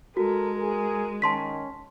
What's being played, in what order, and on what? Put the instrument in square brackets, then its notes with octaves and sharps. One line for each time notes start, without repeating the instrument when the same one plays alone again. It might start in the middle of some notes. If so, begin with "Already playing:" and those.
[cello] G#3 [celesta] F#4 [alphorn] A4 [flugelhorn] A#4
[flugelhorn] G#4 [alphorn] A#4
[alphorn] D#3 [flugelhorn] C#4 [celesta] A5 C6 B6